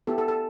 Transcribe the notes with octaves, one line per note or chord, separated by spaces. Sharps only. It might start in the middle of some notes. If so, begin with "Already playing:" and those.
B3 E4 G4 A4
A4
A4